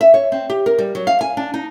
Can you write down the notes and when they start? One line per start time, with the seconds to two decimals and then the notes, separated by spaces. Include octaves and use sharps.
0.01 E5
0.14 C#5
0.32 C4
0.50 G4
0.66 A#4
0.79 G3
0.95 F#3
1.07 F5
1.21 G#5
1.37 D4
1.54 D#4